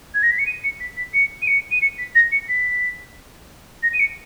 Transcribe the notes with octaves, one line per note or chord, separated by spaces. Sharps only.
G#6
A#6
B6
C#7
D#7
C#7
B6
B6
C#7
D#7
C#7
D#7
C#7
B6
A#6
C#7
B6
A#6
D#7
C#7